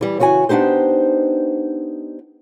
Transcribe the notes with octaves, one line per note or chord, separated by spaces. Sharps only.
E3 G3
C#3 E3 F#4 D#5 G#5
B3 D4 D#4 G4 C5